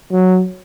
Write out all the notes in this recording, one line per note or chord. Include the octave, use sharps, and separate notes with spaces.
F#3